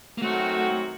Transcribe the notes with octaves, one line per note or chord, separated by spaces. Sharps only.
A#3
F#2 D#3 F#3 A3 C4 F#4